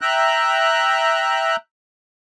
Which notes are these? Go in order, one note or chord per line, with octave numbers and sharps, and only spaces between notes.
E5 G5 A#5 F#6